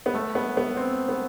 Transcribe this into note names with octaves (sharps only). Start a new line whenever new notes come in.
B3
A3
B3
B3
C4
B3